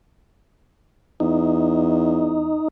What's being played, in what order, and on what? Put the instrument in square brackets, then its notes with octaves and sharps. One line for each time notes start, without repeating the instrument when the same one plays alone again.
[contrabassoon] E2 [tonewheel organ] D#4